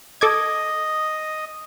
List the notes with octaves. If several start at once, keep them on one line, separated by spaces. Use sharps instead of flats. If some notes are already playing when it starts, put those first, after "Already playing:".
A4 D#5 D6 G#6